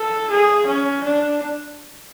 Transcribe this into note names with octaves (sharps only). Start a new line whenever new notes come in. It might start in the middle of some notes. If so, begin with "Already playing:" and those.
Already playing: A4
G#4
C#4
D4